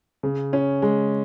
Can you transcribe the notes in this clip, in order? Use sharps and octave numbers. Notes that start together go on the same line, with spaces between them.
C#3
C#4
G#3